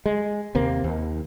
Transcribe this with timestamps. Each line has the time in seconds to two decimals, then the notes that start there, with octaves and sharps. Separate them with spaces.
0.06 G#3
0.55 D#2 C3 A#3 C4
0.84 D#2